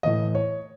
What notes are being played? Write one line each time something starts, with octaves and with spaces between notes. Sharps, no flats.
A2 E3 D#5
C#5